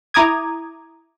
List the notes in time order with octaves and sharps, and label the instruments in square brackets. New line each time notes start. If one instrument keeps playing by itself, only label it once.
[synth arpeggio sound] E4 A#5 D6 D#6 G#6